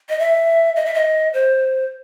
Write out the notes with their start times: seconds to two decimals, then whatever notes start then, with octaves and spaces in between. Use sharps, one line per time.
0.09 D#5
0.19 E5
0.76 D#5
0.85 E5
0.94 D#5
1.33 C5